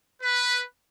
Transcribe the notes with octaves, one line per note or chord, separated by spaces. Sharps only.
B4